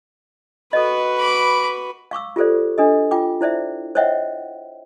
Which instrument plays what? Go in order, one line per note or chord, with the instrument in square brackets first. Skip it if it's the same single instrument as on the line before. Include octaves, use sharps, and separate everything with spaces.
[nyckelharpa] F#4 B4 [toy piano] A4 D#5
[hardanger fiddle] B5 D6
[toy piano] F5 C#6 D6 E6
F4 G4 A4 C5 D5
D4 A4 D#5
F4 G5 D6
E4 C5 D5 E5
C5 C#5 D#5 E5 F#5 G5